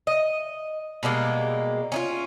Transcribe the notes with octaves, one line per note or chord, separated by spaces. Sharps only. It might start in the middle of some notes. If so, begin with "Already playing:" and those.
D#5
B2 G3 G#3 A#3
C#4 D#4 F4